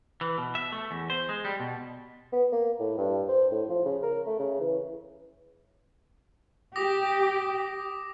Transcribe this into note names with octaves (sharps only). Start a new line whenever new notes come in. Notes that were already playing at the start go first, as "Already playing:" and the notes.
E3
B2
E5
A3
E2
C5
G#3
G3
B2
B3
A#3
A2
G2
C5
A2
F3
C#3
A#4
A3
C#3
E3
G4 D6 D#6 A#6